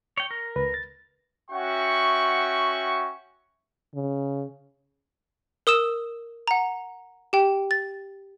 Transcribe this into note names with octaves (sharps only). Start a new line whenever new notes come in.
C#5 G5
A#4
C#2 B4
A6
C#4 F#4 E5 F#5 G5 C#6
C#3
A#4 D#6 E6 E7
F#5 A#5
G4 G5
A6